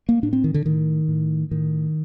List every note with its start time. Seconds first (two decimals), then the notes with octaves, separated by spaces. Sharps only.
0.09 A#3
0.23 A2 D4
0.33 C4
0.44 D#3
0.54 D3
0.65 A2 D#3
1.08 A2
1.51 A2 D#3